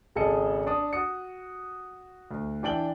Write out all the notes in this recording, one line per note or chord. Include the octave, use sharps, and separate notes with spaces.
G#1 C#3 G#4 A4 D#5 C#7
D4 D#6
F#4 D#6 C#7
D2
E3 D4 G5 F#7 G7